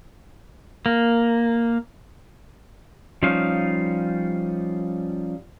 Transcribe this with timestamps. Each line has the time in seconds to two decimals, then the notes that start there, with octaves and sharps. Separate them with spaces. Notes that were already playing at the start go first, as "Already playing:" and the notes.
0.86 A#3
3.23 F3 G3 C#4 D#4 F5